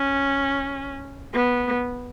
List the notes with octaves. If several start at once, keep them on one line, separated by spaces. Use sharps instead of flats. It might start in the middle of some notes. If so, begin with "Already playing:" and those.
Already playing: C#4
B3